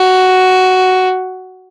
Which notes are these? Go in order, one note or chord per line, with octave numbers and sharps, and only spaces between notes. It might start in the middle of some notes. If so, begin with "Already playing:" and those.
Already playing: F#4